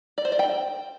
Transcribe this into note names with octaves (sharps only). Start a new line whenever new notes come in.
D5
C5
D5
G5